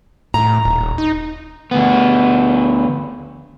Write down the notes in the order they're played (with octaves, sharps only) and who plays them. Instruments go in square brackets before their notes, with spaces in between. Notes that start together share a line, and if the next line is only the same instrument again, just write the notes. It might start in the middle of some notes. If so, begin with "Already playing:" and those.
[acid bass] A2 [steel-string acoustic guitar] A#5
[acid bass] D#1
D#4
[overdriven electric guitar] D2 B3